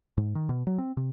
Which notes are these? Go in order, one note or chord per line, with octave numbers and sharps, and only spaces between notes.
G#2
D#3
B2
F#3
C4
C3